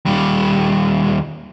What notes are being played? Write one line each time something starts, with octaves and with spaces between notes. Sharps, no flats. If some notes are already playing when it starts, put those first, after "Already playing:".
D#2 G3